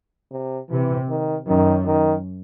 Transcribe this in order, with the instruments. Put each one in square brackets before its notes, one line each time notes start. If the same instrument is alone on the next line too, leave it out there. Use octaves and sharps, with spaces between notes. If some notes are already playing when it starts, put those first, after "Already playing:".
[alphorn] C3
[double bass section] C3 [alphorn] E3
[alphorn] D#3
[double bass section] F#2 [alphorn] D#3
[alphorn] D#3